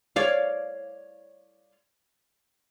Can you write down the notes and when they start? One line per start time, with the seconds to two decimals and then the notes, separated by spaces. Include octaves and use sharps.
0.16 C#5 D5 F5